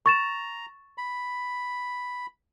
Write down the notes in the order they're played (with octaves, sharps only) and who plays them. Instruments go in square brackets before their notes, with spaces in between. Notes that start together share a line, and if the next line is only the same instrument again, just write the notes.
[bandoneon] A#5 [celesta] C#6 A6 E7
[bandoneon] B5